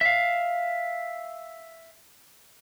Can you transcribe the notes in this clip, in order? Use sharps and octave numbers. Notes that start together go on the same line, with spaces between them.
E5 F5